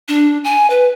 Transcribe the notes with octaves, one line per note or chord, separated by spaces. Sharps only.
D4
G#5
B4